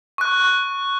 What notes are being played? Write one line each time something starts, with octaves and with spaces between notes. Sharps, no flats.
C#6 F#6